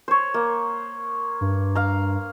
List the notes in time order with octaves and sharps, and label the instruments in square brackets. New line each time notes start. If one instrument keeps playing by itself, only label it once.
[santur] C5 C#5
A#3
[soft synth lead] G2
[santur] F5 A#5